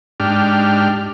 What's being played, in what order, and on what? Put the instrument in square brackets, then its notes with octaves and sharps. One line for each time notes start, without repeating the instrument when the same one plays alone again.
[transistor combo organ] G#2 D4 G4 F6